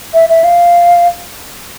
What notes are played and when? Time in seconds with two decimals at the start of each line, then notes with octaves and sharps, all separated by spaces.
0.14 E5
0.29 E5
0.44 F5